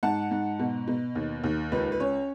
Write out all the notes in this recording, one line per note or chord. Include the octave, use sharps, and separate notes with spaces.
G#2 F#5 A5
G#2
B2
B2
D#2
D#2
C#2 B4
B4
C#4 C#5